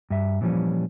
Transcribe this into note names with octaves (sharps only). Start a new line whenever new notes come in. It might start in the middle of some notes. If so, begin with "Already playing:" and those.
G2 E5
A#2 E3 F3 G3 C#4